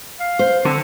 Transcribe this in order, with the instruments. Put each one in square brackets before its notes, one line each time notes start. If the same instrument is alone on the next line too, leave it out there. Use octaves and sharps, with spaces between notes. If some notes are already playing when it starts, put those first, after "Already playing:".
[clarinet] F5
[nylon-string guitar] C5
[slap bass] D3 [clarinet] C4